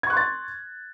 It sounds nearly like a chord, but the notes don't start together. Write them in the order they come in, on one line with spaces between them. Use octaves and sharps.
G#6 C#6 F#6 C6 A6